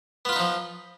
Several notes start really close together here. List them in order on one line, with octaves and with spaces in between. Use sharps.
B3 F4 B4 D#4 F3